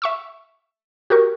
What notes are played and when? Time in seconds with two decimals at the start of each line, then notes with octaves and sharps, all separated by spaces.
0.02 E5 C#6 E6
1.10 F#4 G4 A#4 C#6